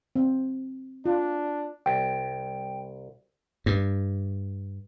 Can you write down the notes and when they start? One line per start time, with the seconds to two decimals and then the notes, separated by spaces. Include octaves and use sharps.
0.16 C4
1.05 D4 F4
1.86 C2 G5
3.66 G2